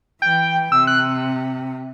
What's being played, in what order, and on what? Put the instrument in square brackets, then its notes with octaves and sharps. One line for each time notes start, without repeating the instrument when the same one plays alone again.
[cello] E3 [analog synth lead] G5
[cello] C3 [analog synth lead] E6
[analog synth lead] F#6